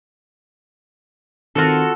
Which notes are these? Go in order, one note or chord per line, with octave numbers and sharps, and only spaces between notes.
D#3 C4 F4 F#4 A4